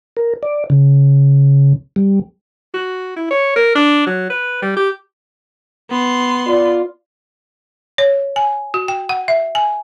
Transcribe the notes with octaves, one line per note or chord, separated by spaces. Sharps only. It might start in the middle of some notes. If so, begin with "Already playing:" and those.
A#4
D5
C#3
G3
F#4
E4
C#5
A#4
D4
F#3
B4
G3
G4
B3 C6
F4 D5
C#5
G#5
F#4
G5
F#5
E5
G#5